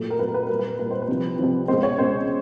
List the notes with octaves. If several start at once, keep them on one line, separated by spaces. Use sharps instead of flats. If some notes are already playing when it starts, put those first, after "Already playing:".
Already playing: A#2 F#3 A3
A#4
A#2 F#3 A3 B4
B4
A#2 G3 A#4
B4
A#2 G3 B4
C5
B4
C2 C3 F3
C2 C3 F3
C#2 B2 G#3 C5
C#5
C#2 B2 G#3 C5